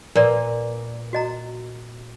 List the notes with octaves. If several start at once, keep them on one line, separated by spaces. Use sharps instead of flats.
A#2 A#4 B4 D5
F#4 D#5 A#5